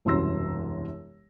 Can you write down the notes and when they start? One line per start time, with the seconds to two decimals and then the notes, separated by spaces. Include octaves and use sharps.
0.05 E1 C2 F#2 C6 E6 A#6